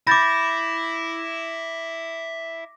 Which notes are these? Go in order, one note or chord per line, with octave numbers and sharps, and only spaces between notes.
E4 B5 D6 G6 A6 A#6